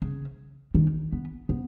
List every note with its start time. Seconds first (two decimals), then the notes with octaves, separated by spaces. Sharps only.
0.02 C#3
0.74 D#3
1.12 B3
1.49 B3